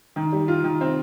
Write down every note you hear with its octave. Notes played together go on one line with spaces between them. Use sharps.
D#3
G3
F4
D#3
C4